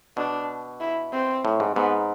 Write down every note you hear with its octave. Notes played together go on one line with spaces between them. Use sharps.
B2 D4
E4
C4
A2
G#2
G#2 B3